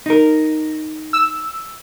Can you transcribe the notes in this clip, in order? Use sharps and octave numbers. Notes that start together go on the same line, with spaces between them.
D#4 A#4
E6